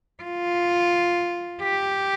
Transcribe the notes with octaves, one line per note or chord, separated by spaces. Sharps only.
F4
G4